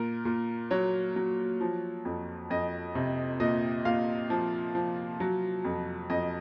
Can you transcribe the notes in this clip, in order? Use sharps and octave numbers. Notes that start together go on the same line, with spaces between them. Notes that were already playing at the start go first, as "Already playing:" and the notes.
Already playing: A#2 A#4
A#2
F#3 C#5
F#3
F3
F2
F2 D#5
C3
A#2 D#5
A#2 F5
F3
F3
F#3
F2
F2 D#5